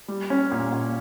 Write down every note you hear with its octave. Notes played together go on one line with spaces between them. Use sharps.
G3
C#4
A#2
A#2